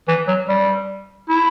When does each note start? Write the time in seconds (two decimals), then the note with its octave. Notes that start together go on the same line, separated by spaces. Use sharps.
0.08 E3
0.28 F#3
0.49 G3
1.29 E4